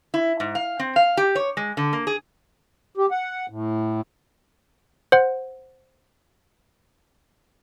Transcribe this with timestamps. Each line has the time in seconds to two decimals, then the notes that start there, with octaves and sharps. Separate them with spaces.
0.14 E4
0.40 G#2
0.55 F5
0.80 C4
0.96 F5
1.17 G4
1.35 C#5
1.57 G#3
1.77 D3
1.93 A#3
2.07 G#4
2.97 G4
3.11 F#5
3.49 A2
5.12 C5 F#5